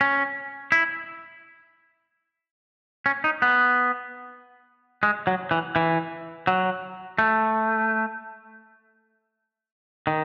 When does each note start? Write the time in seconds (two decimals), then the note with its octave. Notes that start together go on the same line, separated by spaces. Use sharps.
0.01 C#4
0.72 E4
3.06 C#4
3.24 D#4
3.42 B3
5.03 G#3
5.27 F#3
5.51 E3
5.76 E3
6.47 F#3
7.19 A3
10.07 D#3